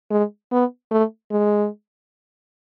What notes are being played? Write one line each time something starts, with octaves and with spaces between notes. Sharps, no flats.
G#3
B3
A3
G#3